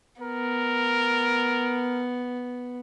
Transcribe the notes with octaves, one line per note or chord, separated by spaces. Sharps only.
B3 A#4